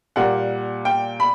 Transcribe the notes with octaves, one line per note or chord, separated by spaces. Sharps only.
A#2 G3 A#3 F#5
G5
B5